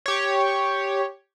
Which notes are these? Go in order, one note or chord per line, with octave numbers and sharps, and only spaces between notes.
G4 C#5